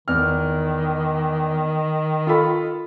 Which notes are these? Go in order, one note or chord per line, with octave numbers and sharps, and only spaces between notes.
E2 D#3 F6
F4 A4 B5